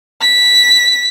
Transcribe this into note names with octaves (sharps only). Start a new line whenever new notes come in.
B6